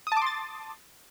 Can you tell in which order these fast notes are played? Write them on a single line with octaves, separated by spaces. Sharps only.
D#6 A5 D6 C6 A6